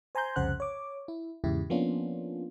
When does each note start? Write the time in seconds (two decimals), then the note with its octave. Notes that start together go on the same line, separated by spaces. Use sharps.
0.15 C5 G#5 A#5 C6 G6
0.36 C2 F2 C#3 C5 F#5 F#6
0.60 C#5 D6
1.08 E4
1.44 E2 G#2 C#3 E4 G4
1.70 F3 A#3 B3 C#4 D4 F4